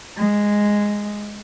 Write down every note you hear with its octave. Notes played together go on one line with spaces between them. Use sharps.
G#3